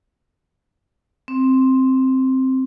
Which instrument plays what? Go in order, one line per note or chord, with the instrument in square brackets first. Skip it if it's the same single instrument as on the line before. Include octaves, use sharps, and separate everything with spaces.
[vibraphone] C4